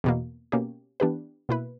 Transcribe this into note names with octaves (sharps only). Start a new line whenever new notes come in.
E2 B2 A#3
B2 A#3 C#4 G4
E3 B3 D4 G4 B4
B2 A#3 E4 B4